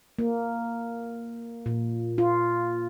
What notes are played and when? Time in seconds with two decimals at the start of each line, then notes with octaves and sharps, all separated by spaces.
0.19 A#3
1.66 A#2
2.18 F4